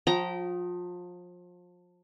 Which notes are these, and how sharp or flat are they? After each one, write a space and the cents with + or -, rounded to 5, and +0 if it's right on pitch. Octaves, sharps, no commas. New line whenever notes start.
F3 +30 G5 -25 A#5 +15